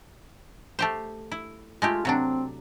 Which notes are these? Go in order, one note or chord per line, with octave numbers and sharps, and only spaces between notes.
A3 G4 C5
E4
G#3 A3 F4 G4
C3 F#3 C4 D4